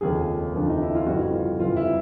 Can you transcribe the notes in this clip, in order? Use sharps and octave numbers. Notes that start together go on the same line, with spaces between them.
F1 D#2 C#3 F3 G#4
F1 D#2 C#3 F3 D4
D#4
E4
F4
G1 F2 C#3 E3 G3 F#4
F4
G1 F2 C#3 E3 G3 F4
E4